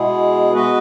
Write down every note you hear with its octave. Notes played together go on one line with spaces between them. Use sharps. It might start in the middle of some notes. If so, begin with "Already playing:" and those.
Already playing: B2 G#3 B3 E4 G#4
G#3 B3 F#4 B4 D#5